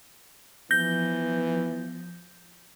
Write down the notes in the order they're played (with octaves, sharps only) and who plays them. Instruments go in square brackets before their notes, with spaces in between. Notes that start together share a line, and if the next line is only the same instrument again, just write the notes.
[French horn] E3 [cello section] F3 [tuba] B3 [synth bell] G6 A#6 G7